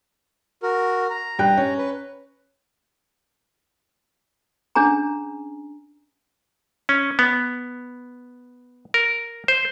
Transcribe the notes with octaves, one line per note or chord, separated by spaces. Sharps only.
F#4 A#4
A#5
G2 G5 F#6
C#4
B4
C#4 D4 G#4 G#5 A#5
C#4
B3
A#4
C5